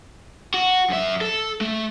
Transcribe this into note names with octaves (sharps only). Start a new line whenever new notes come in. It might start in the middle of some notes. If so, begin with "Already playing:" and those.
F#4
F#2 E5
A4
A3